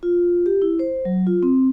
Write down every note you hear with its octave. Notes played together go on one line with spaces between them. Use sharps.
F4
G4
E4
C5
F#3
F4
C4